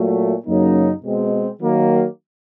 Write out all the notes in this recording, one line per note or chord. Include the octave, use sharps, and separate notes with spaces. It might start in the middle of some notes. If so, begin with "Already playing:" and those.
Already playing: A#2 F#3 A3
F#2 C#3 F#3 A#3 D#4
B2 G#3 C4
D#3 F#3 A#3